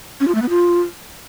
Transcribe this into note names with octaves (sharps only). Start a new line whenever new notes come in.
C#4
F4
A3
B3
F4